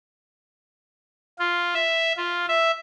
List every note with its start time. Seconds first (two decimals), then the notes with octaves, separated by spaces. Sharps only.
1.39 F4
1.74 E5
2.17 F4
2.48 E5